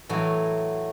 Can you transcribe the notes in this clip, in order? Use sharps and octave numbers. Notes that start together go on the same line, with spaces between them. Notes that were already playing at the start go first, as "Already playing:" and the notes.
A2 E3 F#3